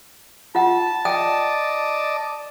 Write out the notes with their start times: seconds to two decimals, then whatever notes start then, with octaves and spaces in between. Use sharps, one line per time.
0.55 F4 F#5 A5
1.05 D5 D#5 G5